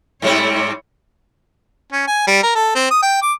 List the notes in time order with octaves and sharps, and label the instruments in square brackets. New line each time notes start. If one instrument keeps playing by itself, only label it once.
[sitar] G#2 G3 C4 [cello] E4 C#5
[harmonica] C#4
G#5
G3
A#4
A4
C4
D#6
G5
D6